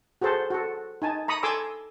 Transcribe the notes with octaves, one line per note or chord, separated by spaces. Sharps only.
F#4 G#4 A4 C5 A5
F#4 A4
D#4 G#5 A5
A#5 B5 C#6 D#6
A4 G#5 C6 D6 E6